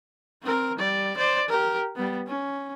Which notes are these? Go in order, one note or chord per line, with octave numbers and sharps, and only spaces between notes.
C4 A#4
G3 D5
C5 D5
G4 A#4
G3 B3
C#4